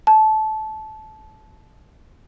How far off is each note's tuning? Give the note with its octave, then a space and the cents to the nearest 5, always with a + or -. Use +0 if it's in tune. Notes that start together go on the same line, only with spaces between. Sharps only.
A5 -20